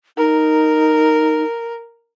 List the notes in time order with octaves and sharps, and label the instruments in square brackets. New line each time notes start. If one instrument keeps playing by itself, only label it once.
[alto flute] D#4 [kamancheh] A#4